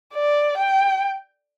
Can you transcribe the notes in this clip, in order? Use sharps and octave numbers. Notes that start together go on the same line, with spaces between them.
D5
G5